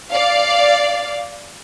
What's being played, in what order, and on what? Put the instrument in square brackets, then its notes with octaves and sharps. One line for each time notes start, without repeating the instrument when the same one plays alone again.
[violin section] D5 F5